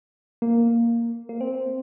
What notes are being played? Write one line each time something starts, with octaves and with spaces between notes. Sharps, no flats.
A#3
A#3
C4